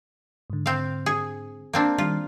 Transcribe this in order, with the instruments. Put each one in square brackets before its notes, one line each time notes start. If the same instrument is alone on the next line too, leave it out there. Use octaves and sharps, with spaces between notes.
[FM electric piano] G#2 D3
[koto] C4 F5
G#4
A#3 C4 D4
[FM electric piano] D#3 G3 [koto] F4